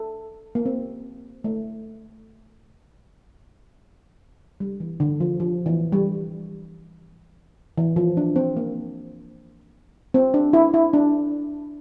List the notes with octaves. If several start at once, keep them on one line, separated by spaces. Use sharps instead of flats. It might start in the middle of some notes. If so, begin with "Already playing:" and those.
Already playing: A4
A#3
C4
A3
G3
E3
D3
F3
F3
E3
G3
E3
F3
D4
C4
A#3
C4
D4
E4
E4
D4